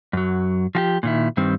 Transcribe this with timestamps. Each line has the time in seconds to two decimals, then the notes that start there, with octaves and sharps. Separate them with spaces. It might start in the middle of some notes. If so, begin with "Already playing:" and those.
0.13 F#2 F#3
0.75 F3 F#4 G4
1.03 A#2 D#3 E4
1.37 G2 D#3 G3 C4